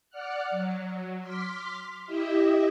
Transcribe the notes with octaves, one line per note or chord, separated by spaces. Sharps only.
D5 F#5 F6 F#6
F#3
C6 D6 F6 B6
E4 G4 D#5 E5